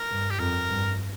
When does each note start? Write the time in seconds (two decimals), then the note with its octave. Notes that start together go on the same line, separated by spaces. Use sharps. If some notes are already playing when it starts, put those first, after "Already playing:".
Already playing: A#4
0.10 G2
0.31 G4
0.39 F2 A#4
0.68 G2